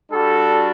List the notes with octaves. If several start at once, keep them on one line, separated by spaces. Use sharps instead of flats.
G3 D4 F#4 A4